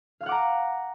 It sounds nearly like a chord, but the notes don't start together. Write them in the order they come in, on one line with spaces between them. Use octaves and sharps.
F5 F6 F#5 D6 A#5